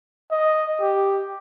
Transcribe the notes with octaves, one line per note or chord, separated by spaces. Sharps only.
D#5
G4